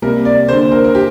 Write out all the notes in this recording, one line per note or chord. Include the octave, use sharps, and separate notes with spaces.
C3 G3 A#3 A#4
D5
D3 A#3 C5
A#4
A#4
G4